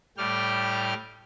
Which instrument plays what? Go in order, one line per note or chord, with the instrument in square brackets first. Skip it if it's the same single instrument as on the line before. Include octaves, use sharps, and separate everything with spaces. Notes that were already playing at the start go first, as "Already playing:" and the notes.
[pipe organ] A2 G3 G4 G5 F6